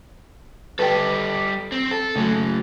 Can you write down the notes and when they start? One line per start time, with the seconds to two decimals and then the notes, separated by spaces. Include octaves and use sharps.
0.79 G3 A4 B4 G5
1.72 C4
1.91 A4
2.16 C#3 F#3 A3